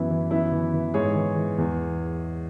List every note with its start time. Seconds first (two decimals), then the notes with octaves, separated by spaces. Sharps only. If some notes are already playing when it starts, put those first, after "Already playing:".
Already playing: F#2 E3 B3 E4
0.10 E3
0.31 F#2 B3 E4
0.52 E3
0.74 E3
0.94 G#2 G#4 C#5
1.15 E3
1.36 E3
1.58 E2